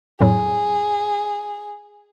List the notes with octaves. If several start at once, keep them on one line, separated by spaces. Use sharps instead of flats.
F2 A2 F#3 G#4